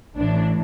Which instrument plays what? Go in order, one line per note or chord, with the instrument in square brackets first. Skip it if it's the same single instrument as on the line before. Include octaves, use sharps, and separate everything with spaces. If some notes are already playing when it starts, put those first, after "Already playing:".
[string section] A1 A2 E3 D4